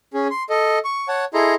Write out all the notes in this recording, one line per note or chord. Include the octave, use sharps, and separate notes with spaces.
C#4 G#4
C6
A4 D#5
C#6
C#5 F#5 A5
E4 G#4 A4 D#5 A#5 C6